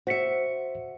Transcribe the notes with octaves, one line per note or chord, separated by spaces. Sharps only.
F#4 C5 E5 B6 C#7